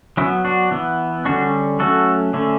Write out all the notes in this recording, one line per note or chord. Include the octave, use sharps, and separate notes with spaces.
F#3 B3 C#4 E4
D4 F#4
E3 B3
D3 G3 C#4 D4 F#4
F#3 A3 C#4 F#4 A4
D3 A3 C#4